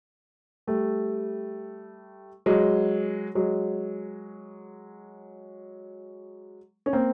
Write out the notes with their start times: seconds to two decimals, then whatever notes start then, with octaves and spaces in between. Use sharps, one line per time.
0.67 G3 A3
2.46 F#3 G#3
3.35 F#3 G#3
6.86 C#4
6.93 A#3 C4